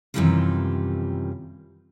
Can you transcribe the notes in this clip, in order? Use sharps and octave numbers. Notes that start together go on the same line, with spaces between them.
F#2 C3 D#3 E3 G3 F4